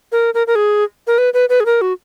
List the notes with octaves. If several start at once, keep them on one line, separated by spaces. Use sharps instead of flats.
A#4
A#4
A#4
G#4
A#4
B4
B4
B4
G#4
A#4
F#4